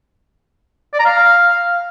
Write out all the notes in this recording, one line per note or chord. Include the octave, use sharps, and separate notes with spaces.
D5
A#5
F5